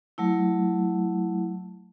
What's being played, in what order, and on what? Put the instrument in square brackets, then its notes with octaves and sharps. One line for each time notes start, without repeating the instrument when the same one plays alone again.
[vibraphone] F#3 A3 E4